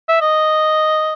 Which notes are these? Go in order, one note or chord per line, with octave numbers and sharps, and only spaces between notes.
E5
D#5